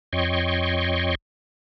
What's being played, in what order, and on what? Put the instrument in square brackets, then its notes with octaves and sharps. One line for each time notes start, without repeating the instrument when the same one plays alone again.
[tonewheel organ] F2 C#5 D#5 G5 C6 C#6